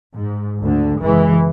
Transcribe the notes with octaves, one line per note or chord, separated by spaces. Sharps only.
G#2
D2 D3
F#1 E3 G#3